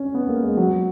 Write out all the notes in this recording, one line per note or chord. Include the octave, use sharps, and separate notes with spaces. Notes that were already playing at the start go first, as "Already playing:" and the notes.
Already playing: C#4
B3
A#3
G#3
F#3